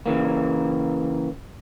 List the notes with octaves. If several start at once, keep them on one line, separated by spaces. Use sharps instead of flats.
C#3 E3 A#3